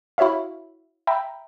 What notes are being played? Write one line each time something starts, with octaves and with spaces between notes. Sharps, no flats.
E4 F#4 C#5 E5 F5
E5 G5 A#5 B5